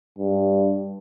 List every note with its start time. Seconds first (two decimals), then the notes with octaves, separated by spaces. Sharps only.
0.19 G2